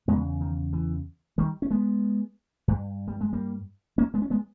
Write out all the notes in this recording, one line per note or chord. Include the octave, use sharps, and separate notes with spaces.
E2 C#3 G#3 B3
D#3
E3
D#3 G3
C#4
G#3 B3
G2
G3
G#3
G3 A#3
A#3 C#4
G#3 B3
C#4
G#3 B3